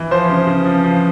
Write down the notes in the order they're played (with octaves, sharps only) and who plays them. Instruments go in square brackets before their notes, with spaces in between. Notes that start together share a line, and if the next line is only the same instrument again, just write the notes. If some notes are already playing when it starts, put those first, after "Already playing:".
Already playing: [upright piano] E3
F3 C5
C#3
C#3
F3
F3